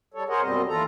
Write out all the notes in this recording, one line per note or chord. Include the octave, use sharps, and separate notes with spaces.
G3 A4 C#5
G#4 A#4 C5 C#5 D#5 F#5
F#2 B2 G3 C4 D#5
D#2 E3 F4 A4 A#5